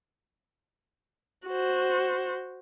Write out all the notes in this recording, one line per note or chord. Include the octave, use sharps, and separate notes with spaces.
F#4 C5